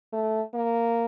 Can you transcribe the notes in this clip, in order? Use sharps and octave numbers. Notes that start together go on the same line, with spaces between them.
A3
A#3